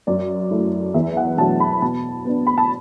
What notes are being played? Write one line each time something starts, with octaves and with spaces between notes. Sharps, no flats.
F#2 D5
F#3 A3 E4
E2 E5
F#5
B2 F#3 A3 D4 A5
B5
B2 A5
B3 D4
B5
A5